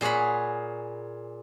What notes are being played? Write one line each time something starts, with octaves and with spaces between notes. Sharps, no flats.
A#2 G#4 C#5 F#5 B5